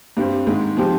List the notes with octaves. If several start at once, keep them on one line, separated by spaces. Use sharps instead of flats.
G2 G3 C4
G#2 D#3 G#3
F3 C4 G4